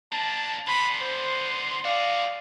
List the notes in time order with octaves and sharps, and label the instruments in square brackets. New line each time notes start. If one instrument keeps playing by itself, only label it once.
[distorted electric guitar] A#3 D4 [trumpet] A5
[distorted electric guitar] D3 B3 [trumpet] B5 [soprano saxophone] C6
[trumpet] C5
[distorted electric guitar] F#4 G#4 [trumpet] D5 [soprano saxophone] F5